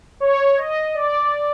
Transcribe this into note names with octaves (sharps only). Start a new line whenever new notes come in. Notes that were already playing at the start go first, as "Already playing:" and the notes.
C#5
D#5
D5